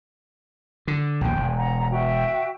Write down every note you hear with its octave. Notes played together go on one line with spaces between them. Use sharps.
D3
A#1 D#2 G5
E1
F#5 A#5
F#4 E5 G5